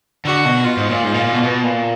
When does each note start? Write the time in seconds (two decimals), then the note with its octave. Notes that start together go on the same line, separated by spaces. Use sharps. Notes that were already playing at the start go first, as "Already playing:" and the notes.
0.25 D3 F#4
0.45 B2
0.64 F4
0.77 G#2
0.90 A#2
1.04 G#2
1.14 A#2
1.24 A#2
1.33 B2
1.43 B2
1.63 A#2